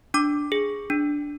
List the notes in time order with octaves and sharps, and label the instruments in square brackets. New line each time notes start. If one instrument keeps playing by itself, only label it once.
[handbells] D4 D6
G#4
D4